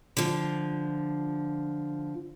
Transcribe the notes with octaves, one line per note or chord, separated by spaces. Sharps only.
D3 F3